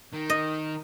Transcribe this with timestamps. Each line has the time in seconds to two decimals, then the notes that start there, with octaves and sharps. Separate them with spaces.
0.13 D#3
0.30 D#5